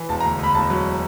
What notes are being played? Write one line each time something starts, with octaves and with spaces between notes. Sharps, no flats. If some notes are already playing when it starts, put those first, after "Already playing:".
Already playing: E3
E1 A5
A#5
D2
D2 B5
E1 A5
F#3